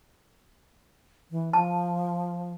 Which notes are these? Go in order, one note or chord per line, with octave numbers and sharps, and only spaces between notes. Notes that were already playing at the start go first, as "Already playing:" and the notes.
E3
F3 A5